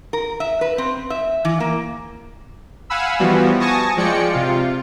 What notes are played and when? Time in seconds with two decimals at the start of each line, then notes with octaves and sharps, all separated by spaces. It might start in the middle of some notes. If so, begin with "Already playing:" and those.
0.13 A#4
0.40 E5
0.61 B4
0.78 C4
1.10 E5
1.45 E3
1.60 A#3
2.90 F5 F#5 G#5 B5 E6
3.20 E3 F3 G3 B3 F#4
3.60 G#5 A5 C#6 D#6 A#6
3.97 F3 G#3 D5 G5 C#7
4.33 C3 F4